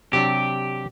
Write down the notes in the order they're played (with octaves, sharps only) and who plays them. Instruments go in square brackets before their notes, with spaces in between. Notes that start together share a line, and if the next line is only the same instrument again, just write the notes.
[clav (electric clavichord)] C3 F#3 D4 [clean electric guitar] G4